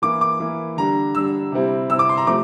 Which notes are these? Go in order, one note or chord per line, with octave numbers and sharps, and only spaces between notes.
E3 A#3 E4 D6
D6
E3 A#3 E4
D3 G3 D4 A#5
D3 G3 D4 E6
C3 G3 C4 E4
C3 G3 C4 E4 E6
D6
C6
A#5
C3 F3 A3 C4 D6